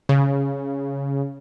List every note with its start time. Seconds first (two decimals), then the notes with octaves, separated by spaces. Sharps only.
0.09 C#3